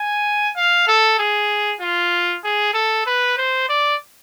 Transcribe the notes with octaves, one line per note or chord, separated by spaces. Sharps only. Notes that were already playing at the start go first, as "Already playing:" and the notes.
Already playing: G#5
F5
A4
G#4
F4
G#4
A4
B4
C5
D5